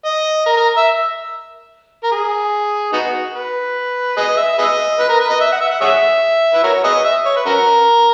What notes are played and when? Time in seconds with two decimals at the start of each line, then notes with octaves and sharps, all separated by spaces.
0.05 D#5
0.46 A#4
0.57 A#4
0.77 E5
2.04 A#4
2.11 G#4
2.93 B3 D#4 F#4
3.34 B4
4.17 G#4 B4 D#5
4.37 E5
4.58 G#4 B4 D#5
5.00 B4
5.09 A#4
5.20 B4
5.30 D#5
5.40 E5
5.52 F#5
5.60 E5
5.71 F#5
5.81 G#4 C#5 E5
6.54 B4
6.64 F#4 A#4 C#5
6.84 G#4 B4 D#5
7.04 E5
7.26 C#5
7.36 B4
7.46 C#4 F#4 A#4